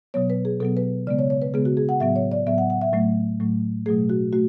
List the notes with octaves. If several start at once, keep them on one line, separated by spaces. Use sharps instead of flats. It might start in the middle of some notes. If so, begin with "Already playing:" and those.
B2 F#3 B3 C#5
B4
G#4
B2 F#3 B3 A4
B4
C#3 G#3 B3 D5
C#5
C#5
B4
C#3 G#3 B3 G#4
F#4
G#4
F#5
A2 F#3 B3 E5
C#5
D5
A2 F#3 B3 E5
F#5
F#5
E5
A2 F#3 A3
A2 F#3 A3
B2 F#3 A3 G#4
F#4
A3 F#4